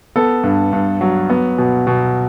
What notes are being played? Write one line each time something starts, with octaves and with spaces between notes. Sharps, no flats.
B3 A4
G2
G2
F#3
B3
B2
B2